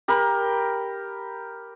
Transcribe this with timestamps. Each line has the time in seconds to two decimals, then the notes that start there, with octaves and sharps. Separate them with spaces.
0.08 G4 A#4 B5